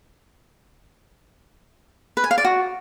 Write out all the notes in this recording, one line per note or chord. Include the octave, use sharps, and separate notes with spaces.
B4
G#5
F5
D5
F#4